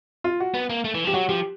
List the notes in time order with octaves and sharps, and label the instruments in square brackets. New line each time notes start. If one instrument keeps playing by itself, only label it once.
[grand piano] F4
F#4
[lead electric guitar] B3
A#3
A3
E3
F3
[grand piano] G4
[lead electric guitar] F#3 [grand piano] F#4
[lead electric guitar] F3 [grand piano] G4